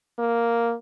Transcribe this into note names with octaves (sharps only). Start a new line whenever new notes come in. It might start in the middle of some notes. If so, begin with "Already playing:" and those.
A#3